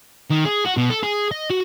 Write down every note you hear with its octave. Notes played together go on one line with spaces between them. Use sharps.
D#3
G#4
F#4
B2
A4
G#4
D#5
F#4